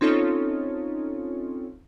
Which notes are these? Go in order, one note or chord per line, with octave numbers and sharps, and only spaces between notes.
C4 C#4 D#4 F4 A4 C#5